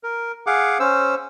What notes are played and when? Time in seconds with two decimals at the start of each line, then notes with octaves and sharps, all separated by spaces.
0.03 A#4
0.47 G#4 F5 F#5 D6
0.80 C#4 C5 E6